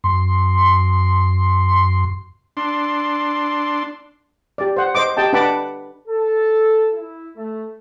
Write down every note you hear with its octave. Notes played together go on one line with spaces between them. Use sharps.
F#2 C6
D4 C6
G4 D5
C5 F#5
C5 D#5 D6
G4 D#5 G5 A5
D4 B4 F#5 A5 B5 D6
A4
E4
A3